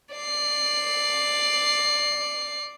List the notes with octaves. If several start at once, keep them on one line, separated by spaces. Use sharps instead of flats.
D5 C7